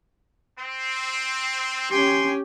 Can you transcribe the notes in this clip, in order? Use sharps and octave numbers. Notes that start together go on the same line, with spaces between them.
C4
C#4 G4 G5 G#5 C6